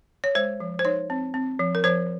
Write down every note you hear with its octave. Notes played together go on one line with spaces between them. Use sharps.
C#5
G#3 C5
F3
C5
D#4 C#5
C4
C4
F3
A#4
F3 C5